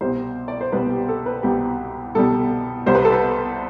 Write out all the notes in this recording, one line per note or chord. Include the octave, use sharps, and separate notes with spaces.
C2 B2 G3 C5
D5
C5
C2 B2 G3 B4
G4
A4
B4
C2 B2 G3 G4
C2 B2 G3 A4
C2 C3 G3 C5
B4
A4
B4